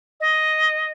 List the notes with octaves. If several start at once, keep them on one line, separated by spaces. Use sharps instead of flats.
D#5